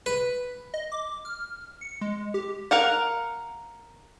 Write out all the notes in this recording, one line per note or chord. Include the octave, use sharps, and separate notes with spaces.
B4
D#5
D6
F6
C#7
G#3
G4
A#4 F5 F#5